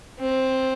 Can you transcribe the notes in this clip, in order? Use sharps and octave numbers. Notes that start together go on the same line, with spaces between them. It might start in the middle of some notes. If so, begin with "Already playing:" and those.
C4